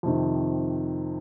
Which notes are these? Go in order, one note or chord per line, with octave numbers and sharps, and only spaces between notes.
F2 C3 D#3